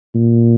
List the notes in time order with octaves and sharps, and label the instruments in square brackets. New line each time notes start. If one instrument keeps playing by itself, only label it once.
[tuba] A#2